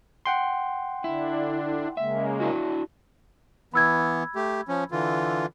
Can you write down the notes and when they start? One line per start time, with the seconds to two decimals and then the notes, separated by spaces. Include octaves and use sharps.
0.26 F#5 G5 C6
1.04 D3 D4 E4
1.97 C#3 G#3 A#3 E5
2.40 D4 E4 F#4
3.74 E3 B3 B5 E6 G#6
4.35 A3 G4
4.68 F3 C#4
4.91 D3 E3 F4